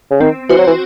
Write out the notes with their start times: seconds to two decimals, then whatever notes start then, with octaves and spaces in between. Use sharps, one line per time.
0.11 C#3
0.20 D#3 C4
0.49 E3 F#4 C5
0.58 F#3
0.67 E3